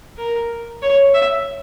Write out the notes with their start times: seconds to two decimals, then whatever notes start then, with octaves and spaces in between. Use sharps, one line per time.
0.18 A#4
0.82 C#5
1.14 E5